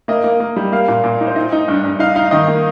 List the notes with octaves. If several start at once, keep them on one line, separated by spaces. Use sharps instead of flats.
A#3 D#5
A#3
A#3
G3
A#3 F5
A#2
A#2
D#4
C5
D#4 D#5
D#4
G2
G2
D#4 F5
D#4 F5
D#3 D#5
A#3